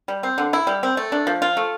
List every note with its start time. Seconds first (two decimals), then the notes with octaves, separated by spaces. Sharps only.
0.08 G3
0.23 C4
0.38 D3
0.53 E4
0.67 G3
0.83 C4
0.97 A3
1.12 D4
1.27 F3
1.42 F4
1.57 A3